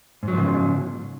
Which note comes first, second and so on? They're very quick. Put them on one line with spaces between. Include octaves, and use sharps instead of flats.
G#2 F#3 F3 C#3